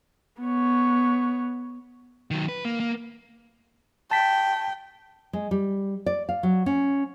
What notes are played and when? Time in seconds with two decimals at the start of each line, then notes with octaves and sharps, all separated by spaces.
0.42 B3 C#5
2.31 D#3 F#3
2.49 B4
2.65 A#3
2.80 A#3
4.11 G5 A5 B6
5.33 G#3
5.51 G3
6.06 D5
6.29 F5
6.43 F#3
6.66 C#4